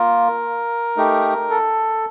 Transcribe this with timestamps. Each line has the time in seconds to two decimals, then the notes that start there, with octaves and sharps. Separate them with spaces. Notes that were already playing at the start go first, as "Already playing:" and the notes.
Already playing: A#3 F4 A#4
0.97 A3 D#4 G4
1.50 A4